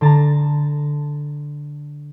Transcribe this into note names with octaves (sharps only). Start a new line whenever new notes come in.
D3 A5 A#5